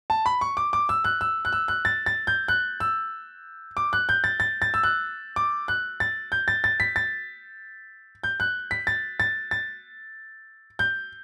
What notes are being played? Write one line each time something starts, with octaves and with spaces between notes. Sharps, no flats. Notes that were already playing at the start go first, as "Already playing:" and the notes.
A5
B5
C#6
D6
D6
E6
F#6
E6
F#6
E6
F#6
A6
A6
G6
F#6
E6
D6
F#6
G6
A6
A6
A6
E6
F#6
D6
F#6
A6
G6
A6
A6
B6
A6
G6
F#6
B6
A6
A6
A6
G6